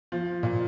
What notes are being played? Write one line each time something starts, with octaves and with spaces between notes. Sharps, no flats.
F3
A#2